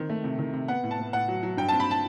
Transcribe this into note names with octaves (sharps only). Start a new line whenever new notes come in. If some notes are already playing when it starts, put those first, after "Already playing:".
Already playing: D#3 C4
A3
C3
D#3
C3
B3 F#5
A2
A5
B3
A2 F#5
F#3
F#3
G2 G5
C4 A5
B5
A5